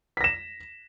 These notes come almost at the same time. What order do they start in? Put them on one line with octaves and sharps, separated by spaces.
B6 A#6 E7